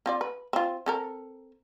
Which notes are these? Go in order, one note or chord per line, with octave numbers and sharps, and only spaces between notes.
C4 F4 D5
B4
C4 F4
C4 A4 A#4